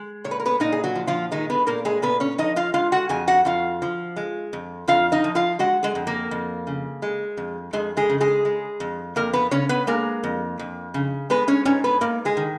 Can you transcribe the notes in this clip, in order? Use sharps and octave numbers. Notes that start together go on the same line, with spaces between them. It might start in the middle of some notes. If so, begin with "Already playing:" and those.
Already playing: G#3
A#2 C#5
B4
A#4
B3 B4
A#2 D#4 D#5
G#4
F#3 F#4
F3
F3 F4
D#3 G#3 D#4
B3 B4
A#2 A#3 A#4
G#3 G#4
A#2 B3 B4
C#4 C#5
F3 D#4 D#5
F4 F5
G#3 F4 F5
F#4 F#5
F2 G#4 G#5
F#4 F#5
F2 F4 F5
F3
G#3
F2
F2 F4 F5
D#4 D#5
F3
F4 F5
G#3 F#4 F#5
G#3 G#4
F2
A#3 A#4
F2
C#3
G#3
F2
F2 G#3 G#4
G#3 G#4
C#3
G#3 G#4
G#3
F2
F2 A#3 A#4
B3 B4
C#3 C#4 C#5
B3 B4
G#3 A#3 A#4
F2
F2
C#3
G#3 B3 B4
C#4 C#5
G#2 C#4 C#5
B3 B4
G#2 A#3 A#4
G#3 G#4
D#3